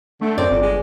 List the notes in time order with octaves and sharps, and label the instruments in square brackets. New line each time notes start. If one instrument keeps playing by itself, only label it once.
[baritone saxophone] D3 [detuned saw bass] A3
[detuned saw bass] F#2 [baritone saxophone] C4 [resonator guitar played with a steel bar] D5
[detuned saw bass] G1 [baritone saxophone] F2
[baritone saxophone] G#3